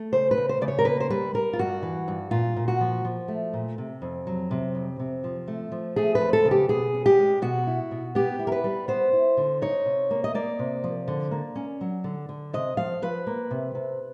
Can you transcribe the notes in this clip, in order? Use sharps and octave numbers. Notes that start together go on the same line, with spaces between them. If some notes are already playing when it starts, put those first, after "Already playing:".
Already playing: A3
C#3 C5
B4
C#3
C5
C#3 D5
C#5
A#4
A#3 B4
C5
G3 B4
G3 A#4
F4
G2 F#4
E3
G2
A#2 F4
A#2
F#4
F3
F3
A3
A#2
C3
F2
F#3
C3
F2
C3
F3
A3
F3
A3 G#4
B4
F2
A4
C#3
G4
B2 G#4
C#4
G4
G#3
B2 F#4
E4
B2
B3 G4
E4
A#4
B4
G3
B3 C5
E4
D3
D#4 C#5
C3
A#3
D#5
A#3 D5
C3
F3
D3
A#3
C#4
F#3
D3
D3
C3 D#5
F3 F5
F3 B4
A#3
C3
C3